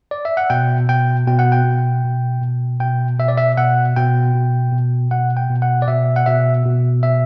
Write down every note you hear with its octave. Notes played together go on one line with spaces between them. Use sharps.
D5
E5
F#5
B2 G5
B2 G5
B2 G5
F#5
G5
B2
B2
B2
B2 G5
B2 E5
D5
E5
B2 F#5
B2 G5
B2
B2
B2 F#5
G5
B2
F#5
D5
B2 E5
F#5
B2 E5
B2
B2 E5